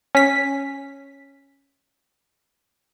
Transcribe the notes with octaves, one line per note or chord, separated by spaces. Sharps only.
C#4 B6